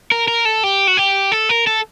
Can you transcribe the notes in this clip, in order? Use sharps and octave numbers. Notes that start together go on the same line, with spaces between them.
A#4
A#4
A4
G4
F#4
G4
A4
A#4
A4